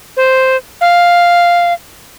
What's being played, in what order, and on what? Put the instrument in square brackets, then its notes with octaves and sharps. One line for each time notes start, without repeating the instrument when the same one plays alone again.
[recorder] C5
F5